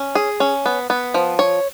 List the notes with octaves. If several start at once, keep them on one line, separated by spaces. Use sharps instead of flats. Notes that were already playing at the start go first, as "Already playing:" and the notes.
Already playing: C#4
G#4
C#4
B3
B3
F3
C#5